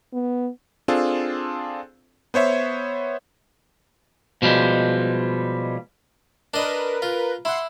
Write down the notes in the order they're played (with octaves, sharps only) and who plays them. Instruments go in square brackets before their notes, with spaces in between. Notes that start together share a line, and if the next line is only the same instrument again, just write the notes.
[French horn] B3
[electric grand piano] C4 D4 F4 G#4 A4
B3 C5 C#5 E5
[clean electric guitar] B2 F3 G3 G#3
[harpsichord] D4 D#5 [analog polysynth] A#4 B4
[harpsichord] F4
[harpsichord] E4 [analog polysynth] F#5 C6